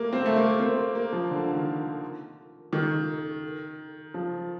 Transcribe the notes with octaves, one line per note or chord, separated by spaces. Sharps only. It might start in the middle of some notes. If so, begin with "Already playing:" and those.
Already playing: G3 A3 A#3
C4
A3
A#3
C4
A#3
A#3
F3
D3
D#3
D#3
F3